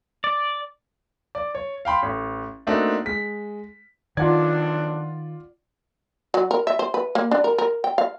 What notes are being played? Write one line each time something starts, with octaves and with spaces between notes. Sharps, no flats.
D5
D5
C#5
F5 G5 B5 C6
A1
A3 A#3 C4 D4 D#4 F#4
G#3 B6
B1 F2 D#3 D4 F4 D5 F#5 G#6
F#3
A#4
E5
C5
B4
A#3
D4
A#4
A#4
G5
F5